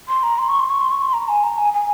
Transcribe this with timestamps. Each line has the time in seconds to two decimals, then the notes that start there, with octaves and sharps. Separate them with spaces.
0.08 C6
0.23 A#5
0.38 C6
0.49 C#6
0.59 C6
0.70 C#6
0.81 C6
0.91 C#6
1.01 C6
1.13 A#5
1.29 G#5
1.43 A#5
1.58 G#5
1.73 G#5